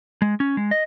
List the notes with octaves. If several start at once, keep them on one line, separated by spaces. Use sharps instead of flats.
G#3
C#4
G#3
D#5